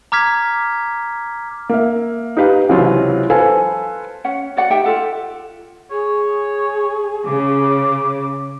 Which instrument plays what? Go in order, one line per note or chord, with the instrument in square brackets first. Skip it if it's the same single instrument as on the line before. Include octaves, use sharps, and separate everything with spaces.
[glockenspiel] A#5 D6 F6 G#6 B6
[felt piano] A#3 E5
D#4 G4 B4 F5 A#5
C#2 C3 E3 F#3 F4
A4 B4 C5 F5 G#5
[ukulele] C#4 F#5
F#4 D5 F#5
D#4 G4 E5 G5
F4 A4 F#5
[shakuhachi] G#4 [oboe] C#5
[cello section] C#3 [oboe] D6